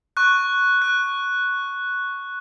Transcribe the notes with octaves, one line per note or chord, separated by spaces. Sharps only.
C#6 F#6
F#6